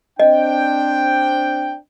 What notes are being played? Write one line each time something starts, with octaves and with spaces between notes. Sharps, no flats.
C4 D4 D#5 G5